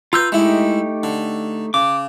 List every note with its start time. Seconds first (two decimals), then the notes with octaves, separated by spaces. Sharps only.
0.13 F4 B4 A#5 E6 G6
0.32 G#3 A3 D#4 E4 G4
1.03 D3
1.74 C#3 D6